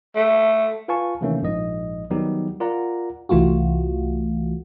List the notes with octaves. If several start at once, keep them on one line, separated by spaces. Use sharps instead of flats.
A3
F4 B4 F5 G#5 A5 C#6
C3 D#3 E3 A3 A#3 C#4
A#1 G#2 D#5
D#3 F#3 G3 B3 D#4 G4
F4 A#4 D5 F#5 A#5
C2 E3 A3 F4 F#4